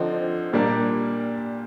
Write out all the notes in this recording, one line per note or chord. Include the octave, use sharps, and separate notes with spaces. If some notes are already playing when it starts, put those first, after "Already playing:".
Already playing: D3 F3 C4 D#4
A#2 G3 A#3 D4